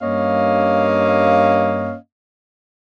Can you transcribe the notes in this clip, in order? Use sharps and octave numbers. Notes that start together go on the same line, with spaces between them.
G2 A#3 C#4 D#5 F5